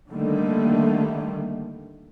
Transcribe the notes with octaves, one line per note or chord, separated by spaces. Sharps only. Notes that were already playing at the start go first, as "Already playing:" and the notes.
D3 D#3 G3 A3 A#3